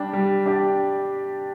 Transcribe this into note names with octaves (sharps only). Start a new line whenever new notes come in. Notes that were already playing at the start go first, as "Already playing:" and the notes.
Already playing: G3 D4 G4
G3
D4 G4